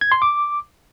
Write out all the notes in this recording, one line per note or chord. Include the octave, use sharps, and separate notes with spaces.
G#6
C6
D6